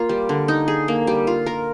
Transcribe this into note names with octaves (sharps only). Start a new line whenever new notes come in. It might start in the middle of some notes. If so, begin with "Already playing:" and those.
Already playing: A#3 F4
G3
D3
D#4
G#4
A#3
G3
F4
A#4